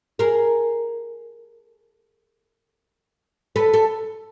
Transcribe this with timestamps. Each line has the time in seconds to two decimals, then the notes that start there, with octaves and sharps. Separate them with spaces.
0.19 G#4 A#4
3.56 A4 B4
3.73 A4